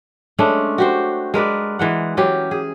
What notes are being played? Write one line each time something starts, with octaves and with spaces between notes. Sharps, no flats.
G#3 A3 C#4 D4
F#4 G4 C5
G#3 A#4 B4 D5
E3 G#3 F#5
E3 F#3 C#4 G4
G#4